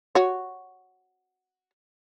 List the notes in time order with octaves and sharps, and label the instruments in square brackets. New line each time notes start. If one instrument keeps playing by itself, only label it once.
[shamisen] F#4 C#5